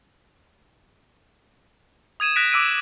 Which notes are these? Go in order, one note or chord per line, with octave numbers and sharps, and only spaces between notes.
D#6 G#6 D#7 E7
F#6 A#6 B6 D7 E7
D6 E6 D7 D#7